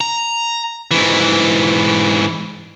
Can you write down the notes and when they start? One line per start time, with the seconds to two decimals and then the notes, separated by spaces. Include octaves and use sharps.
0.01 A#5
0.91 G#2 E3